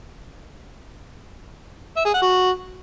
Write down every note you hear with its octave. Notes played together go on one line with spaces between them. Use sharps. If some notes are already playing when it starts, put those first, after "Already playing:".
E5
G#4
F#5
F#4